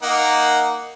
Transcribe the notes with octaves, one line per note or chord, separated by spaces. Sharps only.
A#3 D#4 F#5